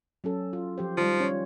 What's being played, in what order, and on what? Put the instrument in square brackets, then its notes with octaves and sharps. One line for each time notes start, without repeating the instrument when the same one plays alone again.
[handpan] F#3 C#4 A4
F4
F3 G4 C5
[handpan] D#3 G3 [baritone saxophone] F3
[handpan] C#4 F4 C#5